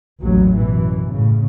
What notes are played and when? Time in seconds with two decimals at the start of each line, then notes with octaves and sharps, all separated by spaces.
0.22 A1 D#2 A2 F#3
0.57 F#2 B2 E3
1.10 A2 C#3